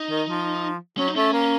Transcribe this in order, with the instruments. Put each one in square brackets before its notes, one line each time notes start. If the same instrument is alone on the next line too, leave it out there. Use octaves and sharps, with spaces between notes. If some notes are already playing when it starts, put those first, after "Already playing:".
Already playing: [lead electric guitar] D#4
[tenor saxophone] D#3
F3
[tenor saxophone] F#3 [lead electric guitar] C#4
[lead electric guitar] D#4
[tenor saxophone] A3 [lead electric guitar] C#4
[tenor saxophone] A#3